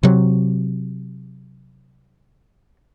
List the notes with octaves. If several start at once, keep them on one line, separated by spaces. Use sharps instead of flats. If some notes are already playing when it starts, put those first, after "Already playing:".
C3 F#3